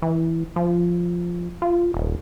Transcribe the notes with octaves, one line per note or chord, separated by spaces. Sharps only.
E3
F3
F4
D#1